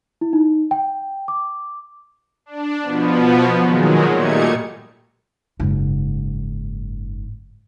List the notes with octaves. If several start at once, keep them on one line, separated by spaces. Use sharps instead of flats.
E4
D#4
G5
D6
D4
B2 F3 B3
A#2 D#3 F#3 G#3
A#2 G3 A3 D#4 G#6 C#7
F#1 G#2